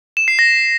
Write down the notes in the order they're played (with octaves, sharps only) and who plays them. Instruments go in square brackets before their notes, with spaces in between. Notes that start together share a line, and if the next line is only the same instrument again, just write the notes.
[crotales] E7
C7
A#6